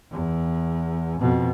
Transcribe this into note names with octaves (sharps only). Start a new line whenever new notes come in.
E2
F2 B2